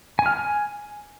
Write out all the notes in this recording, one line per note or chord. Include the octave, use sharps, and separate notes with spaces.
G#5
F6
G#5